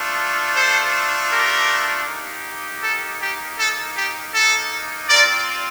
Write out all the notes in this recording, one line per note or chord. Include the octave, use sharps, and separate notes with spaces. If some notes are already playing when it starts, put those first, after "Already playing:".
Already playing: A3 D4 F4
A4 C5
G4 A#4
A#3 D#4 G4
A4
G4
A4
G4
A4
C4 F4 A#4 D5